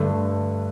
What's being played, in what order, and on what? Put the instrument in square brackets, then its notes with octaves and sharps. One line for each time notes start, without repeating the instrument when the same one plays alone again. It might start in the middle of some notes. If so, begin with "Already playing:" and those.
Already playing: [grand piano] G2 D3 A3